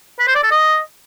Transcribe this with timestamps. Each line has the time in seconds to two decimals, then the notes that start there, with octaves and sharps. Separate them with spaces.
0.19 B4
0.27 C5
0.35 D5
0.43 A4
0.51 D#5